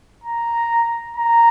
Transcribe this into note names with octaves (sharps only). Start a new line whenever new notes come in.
A#5
A#5